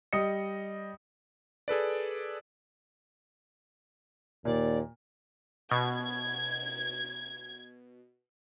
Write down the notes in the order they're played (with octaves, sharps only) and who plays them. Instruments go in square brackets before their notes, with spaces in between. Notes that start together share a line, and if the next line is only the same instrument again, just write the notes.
[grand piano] G3 D#5 D#6 C#7
[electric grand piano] G#4 A4 B4 D5
[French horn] D#2 [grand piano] A#2 [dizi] D5
[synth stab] B2 [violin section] G#6